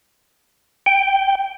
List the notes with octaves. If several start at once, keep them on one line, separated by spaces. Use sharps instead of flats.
G5